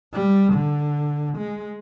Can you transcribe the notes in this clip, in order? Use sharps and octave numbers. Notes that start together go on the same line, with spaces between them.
G3
D3
G#3